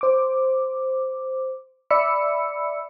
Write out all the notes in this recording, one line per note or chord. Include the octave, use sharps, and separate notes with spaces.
C5 D6
D5 E5 B5 E6 C#7